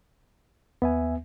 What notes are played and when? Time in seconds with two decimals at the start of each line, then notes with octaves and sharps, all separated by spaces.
0.82 D#2 B3 E5 G#5